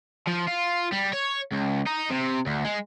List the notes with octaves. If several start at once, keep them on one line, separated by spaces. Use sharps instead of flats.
F3
F4
G3
C#5
C#2
D#4
C3
D2
G#3